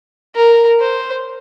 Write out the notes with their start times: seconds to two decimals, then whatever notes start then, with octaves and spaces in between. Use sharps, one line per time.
0.36 A#4
0.81 C5